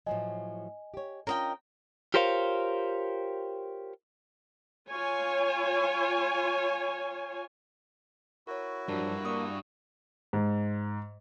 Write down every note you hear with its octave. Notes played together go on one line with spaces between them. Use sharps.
A2 F3 F#3 D#5 G#5
G4 C#5
C#4 D4 F4 A#4 D#5 G5
F4 G4 A#4 C5 C#5 F5
F4 C#5 G#5
E4 F#4 A#4 C#5
G2 F3 F#3 D4 A#4
A#3 D5 C#6 D#6
G#2